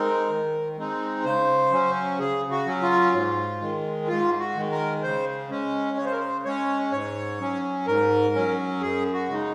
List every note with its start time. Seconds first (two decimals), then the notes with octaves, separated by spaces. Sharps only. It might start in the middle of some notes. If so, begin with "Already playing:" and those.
Already playing: G#3 C4 D#4 A#4
0.29 D#3
0.77 G#3 C4 D#4
1.25 C#3 C5
1.72 F#3 C#4
2.19 C#3 G#4
2.51 F#4
2.66 F#3 C#4
2.82 F4
3.13 G#2
3.61 D#3 G#3
4.08 G#2 F4
4.39 F#4
4.55 D#3 G#3
4.71 A#4
5.03 C#3 C5
5.50 G#3 C#4
5.97 C#3 C#5
6.05 C5
6.12 A#4
6.20 C5
6.45 G#3 C#4 C#5
6.92 G#2 C#5
7.40 F#3 C#4
7.87 G#2 A#4
8.35 F#3 C#4
8.81 F#2 G#4
9.13 F#4
9.29 C#3 G#3 D#4